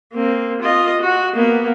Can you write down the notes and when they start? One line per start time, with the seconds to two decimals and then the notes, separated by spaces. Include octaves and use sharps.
0.13 A#3 C4
0.61 F4 D#5
1.01 F#4
1.35 A#3 B3